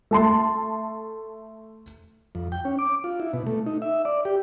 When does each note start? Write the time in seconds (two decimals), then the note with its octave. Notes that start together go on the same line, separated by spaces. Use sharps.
0.11 A3 A5 C6
2.35 F2
2.52 G5
2.65 C#4
2.79 D6
3.04 F4
3.20 E4
3.33 B2
3.47 A3
3.66 D#4
3.82 E5
4.05 D5
4.25 G4